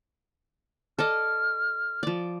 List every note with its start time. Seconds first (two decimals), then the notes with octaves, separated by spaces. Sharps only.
0.99 A4 D5 D#5 F6
2.03 F3 D5